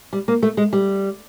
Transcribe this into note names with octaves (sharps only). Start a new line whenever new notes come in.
G3
A#3
A3
G#3
G3